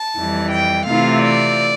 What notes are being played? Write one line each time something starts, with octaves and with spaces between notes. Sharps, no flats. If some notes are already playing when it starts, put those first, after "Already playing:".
Already playing: A5
F2 E3 G3
G5
C3 E3 A3 C4 F4 F5
D5